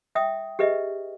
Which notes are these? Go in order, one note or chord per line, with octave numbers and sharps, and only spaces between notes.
E5 G5 D#6
G4 G#4 B4 D#5 E5